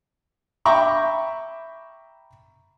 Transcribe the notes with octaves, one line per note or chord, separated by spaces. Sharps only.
E5 G5 A#5 B5 C#6 D6